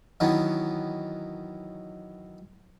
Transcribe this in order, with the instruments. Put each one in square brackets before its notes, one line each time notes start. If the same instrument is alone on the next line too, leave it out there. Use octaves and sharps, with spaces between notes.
[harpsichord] D#3 E3 F#3 B3 C#4